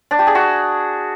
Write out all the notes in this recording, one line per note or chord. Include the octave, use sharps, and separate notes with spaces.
D4
G4
G#4
F#4